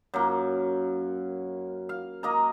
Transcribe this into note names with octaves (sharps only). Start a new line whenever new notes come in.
F#2 A#3
F5
A#3 D#5 A#5